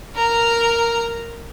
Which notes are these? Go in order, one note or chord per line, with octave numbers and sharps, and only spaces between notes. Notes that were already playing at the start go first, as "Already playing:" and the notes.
A#4 A#5